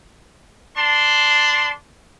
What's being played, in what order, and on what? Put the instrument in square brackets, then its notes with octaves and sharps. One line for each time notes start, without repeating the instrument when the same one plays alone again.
[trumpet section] D4 A5 C6